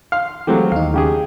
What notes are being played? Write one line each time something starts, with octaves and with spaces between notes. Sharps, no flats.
F5 C6 F6
E3 F#3 G#3 A3 C4 G4
D#2 D#4 F5
C#3 G4 G#4